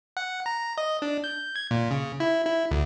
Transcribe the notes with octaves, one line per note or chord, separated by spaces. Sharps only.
F#5
A#5
D#5
D4
G6
G#6
A#2
C#3
E4
E4
D2